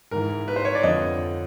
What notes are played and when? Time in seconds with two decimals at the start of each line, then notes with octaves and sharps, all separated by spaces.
0.11 G#2 E3 A#4
0.48 B4
0.56 C5
0.65 C#5
0.75 D5
0.83 F2 D3 D#5